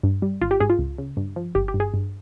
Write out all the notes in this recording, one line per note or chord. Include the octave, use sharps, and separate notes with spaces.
G2
G3
G#1 F4
G4
G#2 G#4
F4
C#2
C#3
G2
F3
G1 G4
G4
G2
G#4
G2